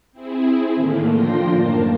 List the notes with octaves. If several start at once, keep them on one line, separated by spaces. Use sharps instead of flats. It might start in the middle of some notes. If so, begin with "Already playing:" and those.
C4 E4 G#4
A2 D3 D#3 A3 A#3
F3 D4 F4 G5 C6 A#6
F#2 A2 A#3 A#4 A5